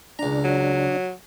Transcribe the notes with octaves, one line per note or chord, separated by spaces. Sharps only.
C#2 D4 A#5
F#3